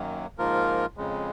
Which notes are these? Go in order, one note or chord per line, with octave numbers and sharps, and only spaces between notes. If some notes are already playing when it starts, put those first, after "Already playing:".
Already playing: F#2 D#3 F#3 A#3
G#2 F3 A#3 F4 A#4
F2 C#3 G#3